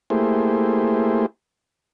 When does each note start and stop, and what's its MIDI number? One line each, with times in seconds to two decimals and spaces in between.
0.10 1.26 57
0.10 1.26 58
0.10 1.26 64
0.10 1.26 67
0.10 1.26 68
0.10 1.26 72